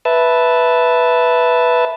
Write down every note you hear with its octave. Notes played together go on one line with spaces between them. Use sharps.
B4 E5 A5